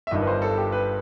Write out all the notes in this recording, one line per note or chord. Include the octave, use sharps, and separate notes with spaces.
E5
G1 G2 D#3 D#5
B4
C5
A4
G4
B4